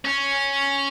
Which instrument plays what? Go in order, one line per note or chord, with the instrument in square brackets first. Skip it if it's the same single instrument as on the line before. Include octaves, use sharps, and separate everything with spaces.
[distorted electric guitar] C#4